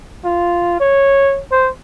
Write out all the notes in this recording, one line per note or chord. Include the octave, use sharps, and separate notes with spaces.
F4
C#5
C5